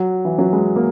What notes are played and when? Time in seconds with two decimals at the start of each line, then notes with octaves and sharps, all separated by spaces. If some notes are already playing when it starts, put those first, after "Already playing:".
Already playing: F#3
0.25 E3
0.39 F#3
0.53 G#3
0.76 A#3